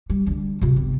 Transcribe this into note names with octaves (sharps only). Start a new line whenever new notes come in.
G3
D3 G3
C3 F4
G1 C3